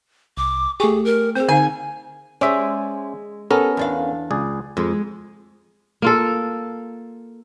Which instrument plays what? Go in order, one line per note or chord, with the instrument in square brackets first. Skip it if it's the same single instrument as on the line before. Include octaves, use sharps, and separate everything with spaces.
[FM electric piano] C2 [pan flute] D6
[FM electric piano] A3 G4 [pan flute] G#4 [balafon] G#5 C#6
[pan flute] A#4
[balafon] C4 G#4 [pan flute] C5
[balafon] D3 D#4 F5 [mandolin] G#5
[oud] G#3 D5 [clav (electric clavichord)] C#4 C5 E5
[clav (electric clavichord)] B3 C#4 A#4 [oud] A4
[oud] E2 D4 F5
[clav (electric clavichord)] C#2 G#4 D5
[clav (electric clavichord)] F2 [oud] G#3
[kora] A#3 F4 A4